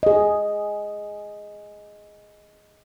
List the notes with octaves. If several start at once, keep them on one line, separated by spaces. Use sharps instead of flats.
G#4 D#5